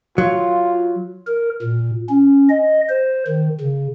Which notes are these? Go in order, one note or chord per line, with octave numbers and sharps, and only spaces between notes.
F#3 F4
A#4
A#2
C#4
D#5
C5
D#3
C#3